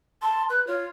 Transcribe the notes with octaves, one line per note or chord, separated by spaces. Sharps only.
A5 C6
B4 F#6
F4 C#5